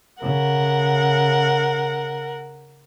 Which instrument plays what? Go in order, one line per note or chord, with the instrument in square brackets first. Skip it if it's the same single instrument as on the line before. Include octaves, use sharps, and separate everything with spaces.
[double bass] C#3 [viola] A#4 F#5